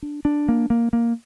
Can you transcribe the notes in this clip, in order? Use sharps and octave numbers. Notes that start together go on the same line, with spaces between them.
D4
D4
A#3
A#3
A#3